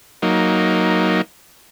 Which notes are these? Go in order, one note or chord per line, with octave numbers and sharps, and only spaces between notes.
F#3 A#3 D#4